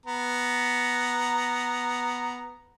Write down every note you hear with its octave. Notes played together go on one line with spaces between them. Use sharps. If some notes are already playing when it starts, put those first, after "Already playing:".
B3 A#5